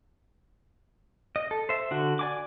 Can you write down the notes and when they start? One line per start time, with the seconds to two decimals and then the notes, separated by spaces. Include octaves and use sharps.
1.36 D#5
1.51 A4
1.69 C5 E5
1.91 D3 F#4
2.19 D5 G#5 D6